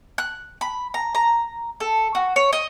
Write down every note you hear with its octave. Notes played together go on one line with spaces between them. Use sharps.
F#6
B5
A#5
A#5
A4
F#4
C#5
D#5